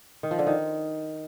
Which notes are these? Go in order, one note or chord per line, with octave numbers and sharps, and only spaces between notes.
D#3
F3
D3
D#3